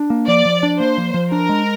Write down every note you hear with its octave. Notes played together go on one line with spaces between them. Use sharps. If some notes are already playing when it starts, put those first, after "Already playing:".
Already playing: D4
A#3
F3 D5
F3
D4
A#3 C5
F3
F3
D4 A#4
G#3